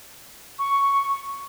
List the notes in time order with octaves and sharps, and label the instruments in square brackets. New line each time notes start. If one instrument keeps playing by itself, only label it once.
[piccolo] C#6